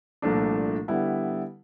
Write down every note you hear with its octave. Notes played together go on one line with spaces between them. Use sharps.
C2 A#2 F3 A3 D4
D3 G3 B3 E4